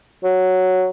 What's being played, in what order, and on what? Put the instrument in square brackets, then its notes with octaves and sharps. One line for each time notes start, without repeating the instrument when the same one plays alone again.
[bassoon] F#3